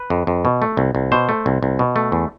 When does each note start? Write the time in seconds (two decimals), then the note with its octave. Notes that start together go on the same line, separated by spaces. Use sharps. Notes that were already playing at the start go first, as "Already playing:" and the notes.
Already playing: B4
0.10 F2
0.27 F2
0.45 B2
0.62 A3
0.77 C2
0.95 C2
1.12 B2 C5
1.29 A3
1.46 C2
1.63 C2
1.79 B2
1.96 A3
2.12 E2